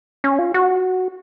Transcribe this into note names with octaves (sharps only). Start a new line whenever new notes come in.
C#4
F4
F#4